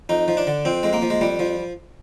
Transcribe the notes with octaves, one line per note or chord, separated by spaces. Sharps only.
F2 D#4
F3
D4
D3
F2 C4
F2 G#3
A#3
F3
G#3
F2 G3
F3